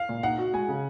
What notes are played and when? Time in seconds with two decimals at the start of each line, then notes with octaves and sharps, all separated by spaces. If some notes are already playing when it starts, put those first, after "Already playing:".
Already playing: F5
0.09 A#2
0.23 D#4 F#5
0.38 F#4
0.53 G#3 G#5
0.69 C#3